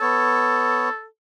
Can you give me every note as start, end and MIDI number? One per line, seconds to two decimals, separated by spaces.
0.01 0.89 59
0.01 1.05 69
0.01 0.89 73